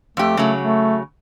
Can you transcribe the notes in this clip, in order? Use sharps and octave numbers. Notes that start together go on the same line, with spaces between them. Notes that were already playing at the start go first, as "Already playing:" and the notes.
F2 A3 G4
C#3 F#3 A3
A3